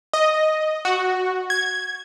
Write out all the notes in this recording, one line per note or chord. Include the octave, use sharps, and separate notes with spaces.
D#5
F#4
G#6